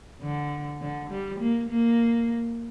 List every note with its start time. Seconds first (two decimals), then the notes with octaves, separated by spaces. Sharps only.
0.22 D3
0.81 D3
1.10 G3
1.40 A#3
1.69 A#3